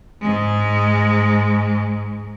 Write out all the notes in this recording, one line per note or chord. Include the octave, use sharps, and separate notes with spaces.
G#2 G#3